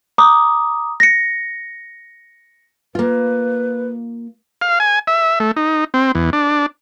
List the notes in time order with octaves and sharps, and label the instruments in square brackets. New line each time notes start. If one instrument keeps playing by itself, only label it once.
[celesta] A#5 D6 D#6
A#6 C#7
[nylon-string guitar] A#3 F4 [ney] B4
[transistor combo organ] F5
G#5
E5
A3
D#4
C4
E2
D4